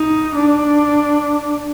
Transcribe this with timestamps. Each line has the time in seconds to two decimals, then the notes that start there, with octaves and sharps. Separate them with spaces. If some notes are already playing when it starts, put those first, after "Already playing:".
Already playing: D#4
0.36 D4